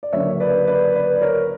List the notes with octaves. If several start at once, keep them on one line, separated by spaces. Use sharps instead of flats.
D5
D2 C#3 F#3 A#3 C#5 E5
B4 D5
B4 D5
B4 D5
D5
A#4 C#5